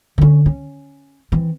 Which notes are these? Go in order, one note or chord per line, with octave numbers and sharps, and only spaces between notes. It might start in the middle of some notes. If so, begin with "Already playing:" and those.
D3 C#4
C#4
E3 C4